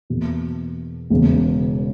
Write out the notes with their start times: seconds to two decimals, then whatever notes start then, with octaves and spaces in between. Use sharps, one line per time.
0.10 E2 B2 A#3
1.10 E1 E2 C#3